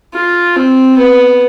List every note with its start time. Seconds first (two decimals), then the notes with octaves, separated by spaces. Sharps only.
0.14 F4
0.56 C4
0.98 B3